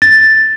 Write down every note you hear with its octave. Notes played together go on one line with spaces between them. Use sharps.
A6